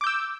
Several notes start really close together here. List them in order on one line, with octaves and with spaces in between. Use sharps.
D6 G6 E6